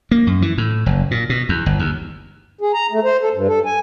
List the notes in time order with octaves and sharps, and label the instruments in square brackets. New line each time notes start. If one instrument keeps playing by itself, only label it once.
[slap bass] A#3
F#2
E3
A2
F#1
A#2
B2
E2
G1
D#2
[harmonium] G#4
A#5
A3
C5
A4
G2
A4
G#5